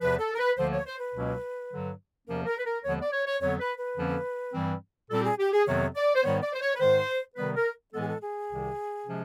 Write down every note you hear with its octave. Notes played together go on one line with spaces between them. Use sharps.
E2 C3 F3 B4
A4
A#4
B4
D2 D3 F3 A#3 C5
C#5
C5
B4
C#2 B2 F#3 A#3 C#4
G2 D3 F#3
E2 C3 F3 A#3 C#4 A#4
A#4
B4
A#4
D#2 D3 F3 G#3 B3 C#5
D5
C#5
C#5
F2 D3 F#3 B3 C#5
B4
B4
F2 D3 F3 A#3 C#4
G2 E3 G3 C4
A#2 G3 C4 A4
G4
G#4
G4
G#4
F2 C3 D#3 F#3 B3 C#5
D5
C5
G#2 D#3 G3 B3 C#5
D5
C5
C#5
B4
G#2 D#3 G#3 C5
C3 D#3 G3 B3 B4
A#4
A2 E3 G#3 B3 A4
G#4
A4
G#4
C2 C3 D#3
C3 F3 G#3 C#4